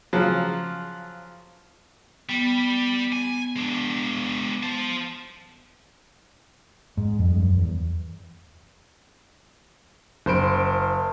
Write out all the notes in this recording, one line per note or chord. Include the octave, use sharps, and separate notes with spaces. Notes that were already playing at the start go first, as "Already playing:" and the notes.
C#3 F3 F#3
G3 B3
G#5
G#3 D4
C5 A5
G#2
F2
G2
F#2
E2
F#1 C5 B5 D7